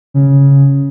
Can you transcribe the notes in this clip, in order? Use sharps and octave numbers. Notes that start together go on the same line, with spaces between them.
C#3